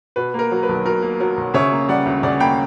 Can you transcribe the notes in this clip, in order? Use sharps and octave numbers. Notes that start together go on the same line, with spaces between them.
B2 B4
A#3 A#4
F#3
B4
B1
B2 A#4
A#3
F#3
B1
C#3 C#5 E5
A#3
G3 D5 F#5
D2
C#3 D5 F#5
A#3 G5 B5